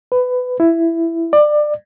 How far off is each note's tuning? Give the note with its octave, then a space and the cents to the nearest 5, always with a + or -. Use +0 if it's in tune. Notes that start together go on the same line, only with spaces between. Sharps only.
B4 +20
E4 +10
D5 +25